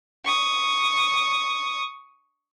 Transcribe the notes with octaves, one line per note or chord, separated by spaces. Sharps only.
C#6 D#6